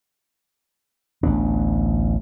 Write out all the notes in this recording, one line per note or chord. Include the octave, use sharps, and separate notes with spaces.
A1 D2 B3 D4